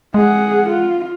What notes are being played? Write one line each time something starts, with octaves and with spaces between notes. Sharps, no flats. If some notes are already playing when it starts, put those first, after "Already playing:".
G#3 G#4 F#5
F4